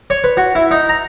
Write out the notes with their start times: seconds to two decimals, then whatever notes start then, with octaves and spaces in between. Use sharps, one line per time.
0.10 C#5
0.24 B4
0.37 F#4
0.55 E4
0.71 D#4
0.89 A#5